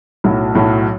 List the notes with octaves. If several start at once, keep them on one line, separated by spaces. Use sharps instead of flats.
B1 A2 F#3
B1 A2 F#3